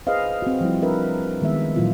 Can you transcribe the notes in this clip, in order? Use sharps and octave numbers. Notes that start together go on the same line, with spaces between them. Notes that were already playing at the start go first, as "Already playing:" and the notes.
G#4 B4 C5 D#5 F5
C4 F#4
F3 G3 E4
D4 A#4 B4 E5
D#3 G#3 B3 E5
A#2 E3 F#3 E4 F4